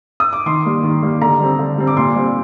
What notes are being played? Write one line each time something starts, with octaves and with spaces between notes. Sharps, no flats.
D#6
D6
D#3 C6
G3 A#3
D#3
G3 A#3
D3 A#5
G3 C4
D3
G3 C4
D6
A#2 C6
G3 C4